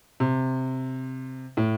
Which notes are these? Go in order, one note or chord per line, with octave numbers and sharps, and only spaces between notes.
C3
A2